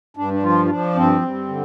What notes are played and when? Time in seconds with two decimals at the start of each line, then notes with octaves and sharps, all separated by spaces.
0.17 G2 D4
0.33 D4
0.43 F3 F4
0.65 F4
0.69 F3 D4
0.96 G2 C4
1.21 G2
1.48 D3